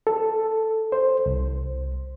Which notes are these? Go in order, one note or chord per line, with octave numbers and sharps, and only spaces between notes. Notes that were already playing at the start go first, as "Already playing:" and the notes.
A4
C5
C2